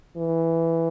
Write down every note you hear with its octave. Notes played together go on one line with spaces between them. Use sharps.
E3